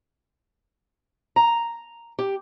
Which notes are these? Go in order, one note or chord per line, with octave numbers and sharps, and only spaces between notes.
A#5
G4